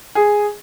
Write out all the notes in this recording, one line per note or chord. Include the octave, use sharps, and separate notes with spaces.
G#4